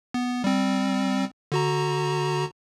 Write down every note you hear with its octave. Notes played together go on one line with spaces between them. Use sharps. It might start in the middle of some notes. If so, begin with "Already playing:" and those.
B3
G3 C4
D3 F#4 A#5